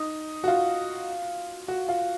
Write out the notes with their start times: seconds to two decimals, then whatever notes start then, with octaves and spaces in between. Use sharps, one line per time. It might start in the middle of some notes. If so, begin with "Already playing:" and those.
Already playing: D#4
0.44 F#4
0.48 F4
1.68 F#4
1.88 F4